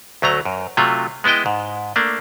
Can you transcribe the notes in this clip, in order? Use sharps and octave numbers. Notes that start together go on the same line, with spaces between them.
D2 F#3 A3 A#5
F#2
C3 F#3 A3 F4
G#3 B3 E4 D#5 G5
G#2
A3 A#3 D4